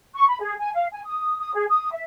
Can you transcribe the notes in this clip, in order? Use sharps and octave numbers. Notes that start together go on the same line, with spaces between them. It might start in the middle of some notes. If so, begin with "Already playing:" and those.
C#6
B5
G#4
G#5
F5
G#5
D#6
D#6
G#4
D#6
E5